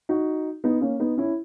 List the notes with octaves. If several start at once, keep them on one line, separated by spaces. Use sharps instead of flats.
D#4 F#4
B3 D#4
A#3 C#4
B3 D#4
C#4 E4